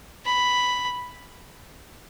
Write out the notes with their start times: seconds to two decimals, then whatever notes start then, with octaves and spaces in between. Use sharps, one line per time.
0.25 B5